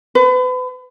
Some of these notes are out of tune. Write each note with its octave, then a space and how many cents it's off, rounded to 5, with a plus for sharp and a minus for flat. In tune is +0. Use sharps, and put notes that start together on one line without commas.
B4 +35